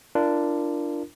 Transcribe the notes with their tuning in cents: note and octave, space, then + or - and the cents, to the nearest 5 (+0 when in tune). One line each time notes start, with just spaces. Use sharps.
D4 +5 F4 -40 A#4 +0